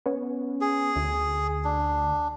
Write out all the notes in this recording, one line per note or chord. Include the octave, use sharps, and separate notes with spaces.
B3 C#4
G#4
D2
D4